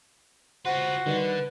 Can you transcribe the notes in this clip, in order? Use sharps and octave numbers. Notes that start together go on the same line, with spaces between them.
F4 F#4 B4 C5 F#5 C6
D3 D#3 G3 B4